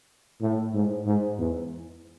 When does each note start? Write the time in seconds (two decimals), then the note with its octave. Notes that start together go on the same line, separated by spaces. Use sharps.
0.42 A2
0.74 G#2
1.06 G#2
1.38 E2